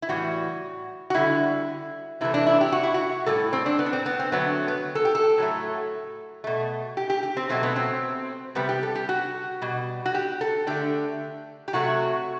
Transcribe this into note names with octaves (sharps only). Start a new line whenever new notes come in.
E4
A2 E3 G3 F#4
F#4
D3 G3 E4
C3 E3 A3 E4
D4
E4
G4
F#4
E4
F#4
A2 G3 A4
C4
D4
B3
D4
C4
B3
C4
D3 F#3 A3 B3
B3
A4
G4
A4
A2 F#3 A3
B2 A3
G4
G4
G4
C4
B2 F#3 A3 C4
B3
C4
C3 G3 B3
G4
A4
G4
F#4
B2 G3
F#4
G4
A4
D3 A3 G4
G4
C3 F#3 A3 F#4